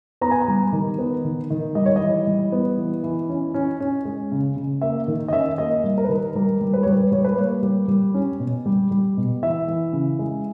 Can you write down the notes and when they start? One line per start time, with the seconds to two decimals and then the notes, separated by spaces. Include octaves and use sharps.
0.21 B3 A#5
0.31 G#5
0.41 A#5
0.48 G3
0.72 D#3
0.99 B3
1.24 D#3
1.50 D#3
1.75 G3 D#5
1.86 C#5
1.96 E3 D#5
2.27 G3
2.52 B3
2.77 E3
3.03 E3
3.29 C#4
3.54 C#4
3.80 C#4
4.05 G#3
4.32 C#3
4.56 C#3
4.81 A#3 E5
5.08 D#3
5.28 D#5
5.33 C#4 E5
5.58 A#3 D#5
5.84 G3
5.98 A#4
6.04 B4
6.09 D#3 A#4
6.35 G3 A#4
6.61 G3
6.74 B4
6.83 G3 C#5
6.92 B4
7.12 G3 C#5
7.25 B4
7.38 A#3 C#5
7.63 G3
7.88 G3
8.14 C#4
8.40 B2
8.66 G3
8.91 G3
9.17 B2
9.42 E3 E5
9.68 E3
9.93 C#3
10.19 G#3